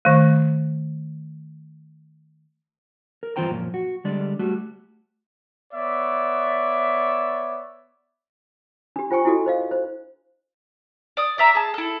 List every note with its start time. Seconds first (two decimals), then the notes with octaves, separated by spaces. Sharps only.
0.05 D#3 A3
3.23 A#4
3.36 G2 E3 F4 C5 G5 A#5
3.51 F#2 A#2 F3
3.74 F#4
4.05 D3 G3 G#3 D5
4.39 G3 A3 F#4
5.73 B3 C#5 D5 E5
8.96 D4 G4
9.10 F4 C5 G5 G#5 C#6
9.25 E4 F#4 A4 D#5
9.46 C5 D#5 F5
9.71 C5
11.17 D5 D#6
11.38 D5 E5 A#5
11.55 G#4 A5
11.74 E4 A4